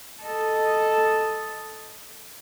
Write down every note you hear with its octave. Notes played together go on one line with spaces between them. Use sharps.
A4 D#5